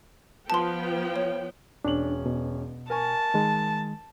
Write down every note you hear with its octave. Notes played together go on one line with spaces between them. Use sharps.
F3 B3 G5 A5 C6
C#5
E1 C#4 D4 F#7
B2
A#4 G#5 A5 C#6
D#3 G#3